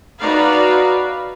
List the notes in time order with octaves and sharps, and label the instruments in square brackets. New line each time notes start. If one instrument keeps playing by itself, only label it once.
[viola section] D#4 F#4 B4 D5 F5